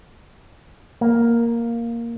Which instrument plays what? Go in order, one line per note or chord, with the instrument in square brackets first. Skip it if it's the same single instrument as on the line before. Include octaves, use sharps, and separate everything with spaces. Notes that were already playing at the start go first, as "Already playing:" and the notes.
[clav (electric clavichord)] A#3